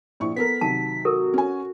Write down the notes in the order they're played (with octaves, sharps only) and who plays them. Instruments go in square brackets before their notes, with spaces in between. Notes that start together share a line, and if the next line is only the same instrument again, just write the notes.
[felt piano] A#1 E4 C#6
[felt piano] B3 A4 A#4 [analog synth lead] B6
[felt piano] C3 D#3 F#3 [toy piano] A5
[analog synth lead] F#4 [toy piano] A4 A#4
[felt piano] C#4 G#5